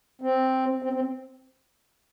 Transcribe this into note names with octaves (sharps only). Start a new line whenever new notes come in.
C4
C4
C4